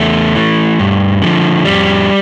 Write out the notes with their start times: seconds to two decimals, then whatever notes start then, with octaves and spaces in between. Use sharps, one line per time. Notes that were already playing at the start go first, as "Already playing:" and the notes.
Already playing: E2 A3
0.35 E3
0.79 G2
1.22 D3 F3
1.65 F2 G3